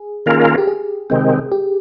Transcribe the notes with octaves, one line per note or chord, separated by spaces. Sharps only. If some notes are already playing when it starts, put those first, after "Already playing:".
Already playing: G#4
D#3 A#3 C#4 F4 A#4
G4
G#4
C3 D#3 G#3 C4
G4